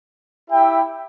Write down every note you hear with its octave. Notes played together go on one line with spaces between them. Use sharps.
E4 G4 E5 G5